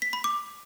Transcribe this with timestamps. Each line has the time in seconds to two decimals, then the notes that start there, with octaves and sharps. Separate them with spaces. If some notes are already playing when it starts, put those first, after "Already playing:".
0.02 B6
0.13 B5
0.24 D6